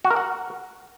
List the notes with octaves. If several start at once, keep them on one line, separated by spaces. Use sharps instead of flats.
F#4
A#4
F#5